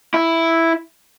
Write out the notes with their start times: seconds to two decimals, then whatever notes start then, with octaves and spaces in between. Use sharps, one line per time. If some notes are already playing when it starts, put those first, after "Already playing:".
0.14 E4